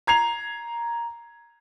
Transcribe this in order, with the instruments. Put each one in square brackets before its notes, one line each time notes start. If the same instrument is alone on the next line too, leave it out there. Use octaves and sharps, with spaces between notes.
[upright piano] A#5 G#6 C7 F7